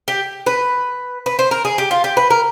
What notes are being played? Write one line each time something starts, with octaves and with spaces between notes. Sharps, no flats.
G4
B4
B4
C5
A#4
G#4
G4
F4
G4
B4
A#4